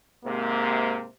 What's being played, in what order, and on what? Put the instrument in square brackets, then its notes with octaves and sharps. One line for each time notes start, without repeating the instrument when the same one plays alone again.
[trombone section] G#2 C3 [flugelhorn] A#3